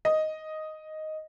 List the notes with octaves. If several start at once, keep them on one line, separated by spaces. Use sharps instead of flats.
D#5